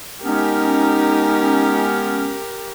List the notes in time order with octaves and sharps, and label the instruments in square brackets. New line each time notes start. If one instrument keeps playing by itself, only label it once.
[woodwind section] G#3 B3 C#4 [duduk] D#4 [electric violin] G4 A#4